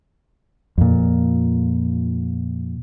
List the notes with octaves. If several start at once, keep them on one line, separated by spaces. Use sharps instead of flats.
F2 A#2